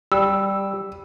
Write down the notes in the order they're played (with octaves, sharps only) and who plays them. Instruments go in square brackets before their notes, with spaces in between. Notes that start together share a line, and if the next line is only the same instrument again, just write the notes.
[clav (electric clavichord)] G3 [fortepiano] E6